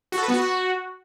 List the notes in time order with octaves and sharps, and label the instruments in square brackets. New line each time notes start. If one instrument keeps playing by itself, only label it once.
[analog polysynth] F#4
A4
B4
B3
F#4